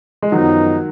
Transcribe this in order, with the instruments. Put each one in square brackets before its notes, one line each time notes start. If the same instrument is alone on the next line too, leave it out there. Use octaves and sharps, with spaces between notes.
[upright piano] G#3
[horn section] F#2 F3 B3 D#4 [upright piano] D#3 F#3